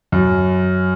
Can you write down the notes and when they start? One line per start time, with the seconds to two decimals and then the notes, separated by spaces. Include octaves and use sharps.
0.12 F#2